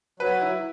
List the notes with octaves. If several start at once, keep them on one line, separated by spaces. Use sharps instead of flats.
F#3 B4
E4